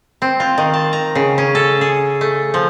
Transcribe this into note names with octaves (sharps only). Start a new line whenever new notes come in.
C4
F4
D#3
A5
A#5
C#3
C#4
A4
G#4
A3
F3